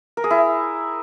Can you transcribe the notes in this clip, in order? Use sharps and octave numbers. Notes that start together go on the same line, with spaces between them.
A#4
G#4
E4